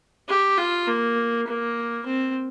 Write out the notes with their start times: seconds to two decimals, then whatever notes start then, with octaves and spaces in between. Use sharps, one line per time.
0.29 G4
0.58 F4
0.87 A#3
1.48 A#3
2.07 C4